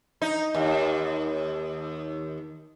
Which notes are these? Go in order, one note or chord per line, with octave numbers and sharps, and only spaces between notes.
D#4
D#2